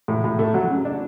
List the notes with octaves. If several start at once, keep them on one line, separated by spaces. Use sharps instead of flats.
A2
A2
A3
F#3
C#3
D4